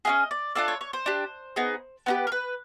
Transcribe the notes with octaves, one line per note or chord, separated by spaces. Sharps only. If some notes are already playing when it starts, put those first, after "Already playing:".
C#4 F4 G#4 D#5
D5
D4 F4 A4 D5
C#5
C#5
C5
D4 G4
B3 D#4 G#4
B3 D#4 G4 B4
A#4
B4